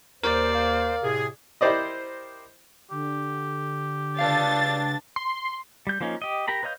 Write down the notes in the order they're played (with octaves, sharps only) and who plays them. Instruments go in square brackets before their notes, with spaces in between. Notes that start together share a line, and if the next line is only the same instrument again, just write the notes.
[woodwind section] D#2 C5 [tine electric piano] A#4 [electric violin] D5
[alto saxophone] F5
[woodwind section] A2 C3 G#4
[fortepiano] E4 G4 A#4 C5 D5 D#5
[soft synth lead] D3 [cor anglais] G4
[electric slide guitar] C#3 B4 F5 [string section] D4 A6
[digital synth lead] C6
[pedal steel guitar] G3 G6
F3 A#3 C#4 D#4
G4 D#5
G4 A#4 A#5 B5
B4 C#5 D#5 F5 G6